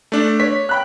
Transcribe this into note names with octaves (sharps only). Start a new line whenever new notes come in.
A3 D4
C#5 B6
G5 B5 F#6